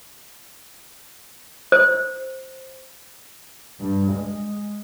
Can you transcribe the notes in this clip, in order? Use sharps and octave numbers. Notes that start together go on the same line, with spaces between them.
C5
G2
G#3